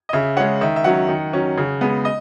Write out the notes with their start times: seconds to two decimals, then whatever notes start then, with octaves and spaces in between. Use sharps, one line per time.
0.09 D#5
0.13 C#3 E5
0.37 G#3 C#4 F#5
0.61 D#3 E5
0.76 E5
0.84 F#3 C#4 F#5
1.08 D#3
1.33 F#3 C#4
1.57 C#3
1.81 G#3 B3
2.05 D#5